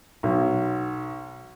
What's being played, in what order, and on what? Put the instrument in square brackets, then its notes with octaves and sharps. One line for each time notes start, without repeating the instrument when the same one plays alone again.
[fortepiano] B1